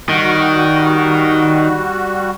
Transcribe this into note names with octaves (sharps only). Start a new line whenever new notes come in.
D#3 G3 F#4